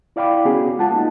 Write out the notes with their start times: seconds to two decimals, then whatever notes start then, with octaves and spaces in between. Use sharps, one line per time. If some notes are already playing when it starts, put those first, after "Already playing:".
0.16 E4 D5 F5 G5 B5 D6
0.45 B3 C#4 F#4 G#4
0.77 G#3 F4 F#5 A5
0.91 A#3 D#4